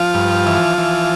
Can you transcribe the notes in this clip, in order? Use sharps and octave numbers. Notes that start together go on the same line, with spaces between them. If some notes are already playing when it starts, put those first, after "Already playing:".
Already playing: F3 F4
G2
E3
E3